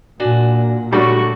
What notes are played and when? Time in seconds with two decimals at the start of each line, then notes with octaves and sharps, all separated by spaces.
0.20 A#2 D4 F#4 G#5
0.93 F#2 D3 G3 A3 D4 F#4 C#6